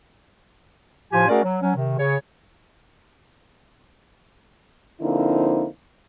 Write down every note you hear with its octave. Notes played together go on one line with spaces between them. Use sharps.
A2 F3 F4 G4 G#5
A3 C#4 F#4 G#4 A#4 D5
F#3
F#3 C#4
C3 D#3
C#3 C#5
D3 F3 A#3 C4 D#4 E4